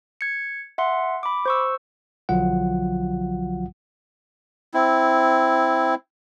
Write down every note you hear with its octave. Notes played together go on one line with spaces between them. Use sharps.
G#6 C#7
E5 F#5 C6
B5 D6
C5 C#6 E6
B1 D3 F3 F#3 F4 F#5
C4 E4